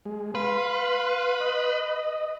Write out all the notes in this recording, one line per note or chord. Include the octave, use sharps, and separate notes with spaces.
G#3
B4 F5 C6
D#5